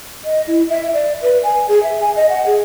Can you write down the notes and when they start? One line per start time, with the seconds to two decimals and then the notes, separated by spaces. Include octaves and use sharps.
0.25 D#5
0.47 E4
0.70 E5
0.94 D5
1.22 B4
1.43 G#5
1.68 G#4
1.83 E5
2.01 G#5
2.16 D#5
2.29 F#5
2.46 G#4